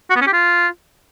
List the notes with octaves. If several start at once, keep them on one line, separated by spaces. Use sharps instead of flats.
F#4
B3
C#4
G4
F4